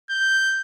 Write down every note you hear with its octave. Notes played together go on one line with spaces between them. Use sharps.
G6